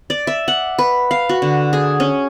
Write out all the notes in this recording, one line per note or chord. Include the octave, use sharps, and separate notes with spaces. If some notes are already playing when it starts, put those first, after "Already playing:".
D5
E5
F#5
B4
F5
F#4
D3
G#4
C#4